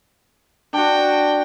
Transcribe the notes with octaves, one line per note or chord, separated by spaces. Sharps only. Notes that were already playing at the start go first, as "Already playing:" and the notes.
D4 F#4 G5